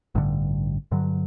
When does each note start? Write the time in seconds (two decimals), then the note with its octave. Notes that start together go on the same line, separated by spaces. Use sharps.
0.15 A1 G2 D3
0.92 G2 D3 F#3